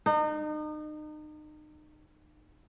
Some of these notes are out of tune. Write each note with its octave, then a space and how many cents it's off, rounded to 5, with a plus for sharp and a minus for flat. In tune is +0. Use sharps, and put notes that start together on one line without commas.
D#4 -35